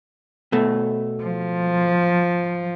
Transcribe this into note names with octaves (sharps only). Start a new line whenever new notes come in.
B2 A3
F3